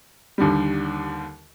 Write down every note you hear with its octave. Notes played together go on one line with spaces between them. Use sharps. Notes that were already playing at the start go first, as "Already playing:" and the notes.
D#2 D3 G3